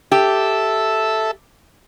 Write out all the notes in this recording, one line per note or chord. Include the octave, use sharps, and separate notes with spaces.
G4 A4 E5